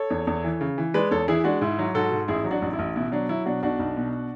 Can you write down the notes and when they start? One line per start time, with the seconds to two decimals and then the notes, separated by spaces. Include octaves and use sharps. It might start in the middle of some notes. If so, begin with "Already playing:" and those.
Already playing: A4 C#5
0.10 E2
0.27 E2
0.44 E3
0.61 C#3
0.78 E3
0.94 G#3 B4 D5
1.11 E2 A4 C#5
1.28 E3 E4 G#4
1.44 G#3 D4 F#4
1.61 G#2 E4
1.79 F#3
1.94 G#2 F#4 A4
2.12 G#2
2.28 A1 E4 G#4
2.45 F#3
2.51 D4 F#4
2.62 A1
2.73 E4
2.79 A1
2.96 B2 E4
3.12 F#3 D4
3.29 F#3 E4
3.46 B2 D4 F#4
3.63 B1 D4 F#4
3.79 B1
3.97 B2